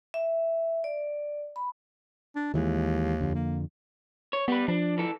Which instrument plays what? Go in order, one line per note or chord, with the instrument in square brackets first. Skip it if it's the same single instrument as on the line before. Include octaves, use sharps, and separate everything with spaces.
[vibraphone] E5
D5
B5
[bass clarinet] D4
[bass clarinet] D#2 [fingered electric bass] D#3 E3 G#3
[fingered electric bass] F2 D3
[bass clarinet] A#3
[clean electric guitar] C#5
[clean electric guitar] G3 B4 [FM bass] B3
[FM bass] F3 [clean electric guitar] D4
[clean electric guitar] E3 A4